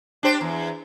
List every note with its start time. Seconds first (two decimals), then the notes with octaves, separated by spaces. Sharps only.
0.23 D4 G4 C5
0.41 E2